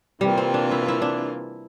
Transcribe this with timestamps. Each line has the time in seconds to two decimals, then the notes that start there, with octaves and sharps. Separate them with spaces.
0.21 C3 E3 G3 A#3 F4
0.38 C4
0.54 D4
0.71 E4
0.88 E4
1.02 D4